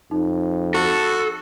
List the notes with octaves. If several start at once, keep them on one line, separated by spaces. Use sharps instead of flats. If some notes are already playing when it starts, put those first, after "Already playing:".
F2 D#4
F#4 A4